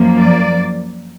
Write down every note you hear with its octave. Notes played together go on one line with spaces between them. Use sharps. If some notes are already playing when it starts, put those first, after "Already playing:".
Already playing: F#2 F3 A#3
D5